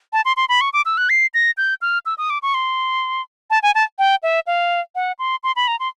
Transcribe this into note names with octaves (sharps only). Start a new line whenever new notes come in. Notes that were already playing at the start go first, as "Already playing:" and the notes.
A5
C6
C6
B5
C#6
D6
E6
F#6
C7
A#6
G6
F6
E6
D#6
D6
C#6
C6
A5
G#5
A5
G5
E5
F5
F#5
C6
C6
B5
A#5
C6